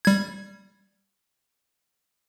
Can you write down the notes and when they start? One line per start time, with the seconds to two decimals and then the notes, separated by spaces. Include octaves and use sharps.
0.05 G3 G#6